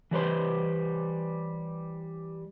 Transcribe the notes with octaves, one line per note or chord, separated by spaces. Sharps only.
E3 G3 B4 C5